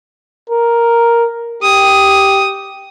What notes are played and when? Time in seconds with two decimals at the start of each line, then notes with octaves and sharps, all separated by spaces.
0.50 A#4
1.63 G4 D#6